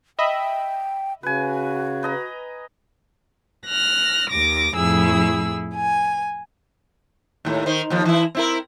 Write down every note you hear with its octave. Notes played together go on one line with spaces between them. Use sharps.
D#5 E5 G5 B5
C#3 F#4 B4 G#5
B4 D#5 A#5
F6 F#6 A#6
D#2 D6 A#6
F2 A2 E4 G#4 E6
G#5
D#2 A2
D#3 C5
D#2 F3
E3 E4
C4 E4 A#4